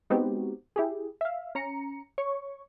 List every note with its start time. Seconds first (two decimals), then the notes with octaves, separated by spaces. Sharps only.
0.10 G#3 B3 C4 D#4 F#4 G4
0.76 E4 G4 G#4
1.21 E5 F5
1.55 C#4 A#5 C#7
2.18 C#5 C#6